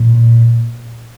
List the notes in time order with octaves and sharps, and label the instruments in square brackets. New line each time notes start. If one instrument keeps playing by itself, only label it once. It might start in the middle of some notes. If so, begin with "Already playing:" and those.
Already playing: [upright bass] A#2